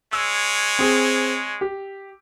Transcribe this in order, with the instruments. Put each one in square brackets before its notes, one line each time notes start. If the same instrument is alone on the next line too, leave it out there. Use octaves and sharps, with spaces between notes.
[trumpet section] G#3 C#5 [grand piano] E6
[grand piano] C4 G#4
G4